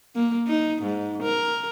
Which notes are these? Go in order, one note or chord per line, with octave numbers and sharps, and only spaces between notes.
A#3
D#4
G#2
A#4